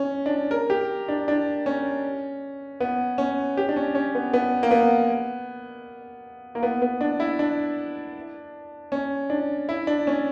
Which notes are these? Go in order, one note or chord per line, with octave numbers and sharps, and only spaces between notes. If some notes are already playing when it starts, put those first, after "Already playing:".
Already playing: C#4
D4
A#4
G4
D4
D4
C#4
B3
C#4
G4
D4
C#4
C#4
B3
B3
A#3
B3
A#3
B3
B3
D4
E4
D4
C#4
D4
E4
D4
C#4